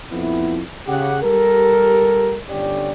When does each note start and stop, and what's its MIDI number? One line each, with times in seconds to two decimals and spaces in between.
0.11 0.59 41
0.11 0.59 59
0.11 0.59 64
0.87 1.18 49
0.87 1.18 67
0.87 1.18 78
1.22 2.37 55
1.22 2.37 67
1.22 2.37 69
1.22 2.37 70
2.49 2.92 31
2.49 2.92 50
2.49 2.92 61
2.49 2.92 67
2.49 2.92 74